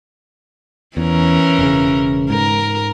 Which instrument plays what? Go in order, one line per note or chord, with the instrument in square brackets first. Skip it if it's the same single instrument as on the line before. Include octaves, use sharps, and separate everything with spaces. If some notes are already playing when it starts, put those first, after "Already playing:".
[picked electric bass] E2 [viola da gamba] E3 C#4 A#4
[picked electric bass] E1 C#3
[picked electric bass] G#2 [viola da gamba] A#4